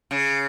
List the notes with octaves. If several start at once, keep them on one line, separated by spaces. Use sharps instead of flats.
C#3